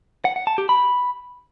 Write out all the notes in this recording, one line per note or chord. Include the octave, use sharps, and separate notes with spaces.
F#5
F#5
A5
G4
B5